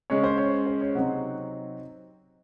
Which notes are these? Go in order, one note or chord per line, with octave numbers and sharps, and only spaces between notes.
C#3 G#3 C#4 C#5
C5
C#5
C5
C#5
C3 F#3 C4 D#4 F#5